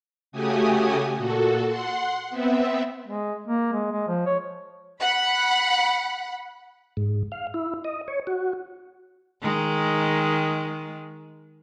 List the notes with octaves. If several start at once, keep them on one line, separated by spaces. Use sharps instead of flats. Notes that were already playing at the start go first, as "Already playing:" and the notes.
C#3 A3 F#4 G4 G#5 D#6
A#2 F#4 A4
F#5 C6
B3 C4 E5
G#3
A#3
G#3
G#3
F3
C#5
F#5 B5
G#2
F5
E4
D#5
C#5
F#4
D#3 G#3